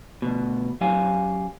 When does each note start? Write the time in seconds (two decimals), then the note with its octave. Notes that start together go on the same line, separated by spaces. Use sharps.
0.22 D2 B2
0.81 F#2 F#3 G4 F5 G#5